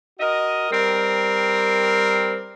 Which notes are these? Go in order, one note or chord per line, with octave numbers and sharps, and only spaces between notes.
F#4 A#4 D#5
G3 C4 A#4